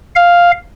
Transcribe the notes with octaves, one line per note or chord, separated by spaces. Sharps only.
F5